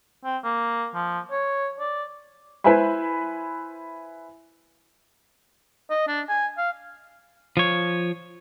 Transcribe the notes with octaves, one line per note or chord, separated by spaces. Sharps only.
C4
A#3
F3
C#5
D5
E4 B4 C5 E5 G#5 B5
D#5
D4
G#5
F5
F3 C#5